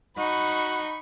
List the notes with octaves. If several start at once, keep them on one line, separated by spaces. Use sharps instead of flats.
D#4 F#4 B5 C#6